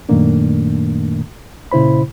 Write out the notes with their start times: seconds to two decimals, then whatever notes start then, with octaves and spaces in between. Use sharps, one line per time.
0.09 F#2 A#2 D#3 A3 A#3 D4
1.72 A#2 C#3 E4 C5 B5